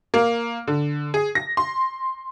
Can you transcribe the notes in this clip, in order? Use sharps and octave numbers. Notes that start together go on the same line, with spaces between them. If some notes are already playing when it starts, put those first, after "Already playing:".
A#3
D3
G#4
A#6
C6